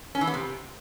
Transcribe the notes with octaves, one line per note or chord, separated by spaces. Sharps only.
C#4
E3
B3
C3